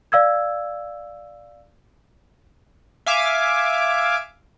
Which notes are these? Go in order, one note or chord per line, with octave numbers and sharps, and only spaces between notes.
D5 F5 E6 G#6
E5 F5 G#5 D6